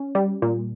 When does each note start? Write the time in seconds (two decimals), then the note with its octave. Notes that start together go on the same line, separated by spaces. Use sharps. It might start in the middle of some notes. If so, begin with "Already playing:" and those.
Already playing: C#4
0.15 G3
0.42 A#2